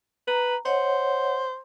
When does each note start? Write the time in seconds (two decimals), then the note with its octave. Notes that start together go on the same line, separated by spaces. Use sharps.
0.28 B4 A#5
0.65 C5 C#5 D#5 F#5